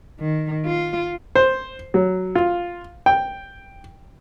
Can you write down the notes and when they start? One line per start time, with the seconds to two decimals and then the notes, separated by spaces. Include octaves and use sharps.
0.20 D#3
0.66 F4
1.36 C5
1.94 F#3
2.35 F4
3.06 G5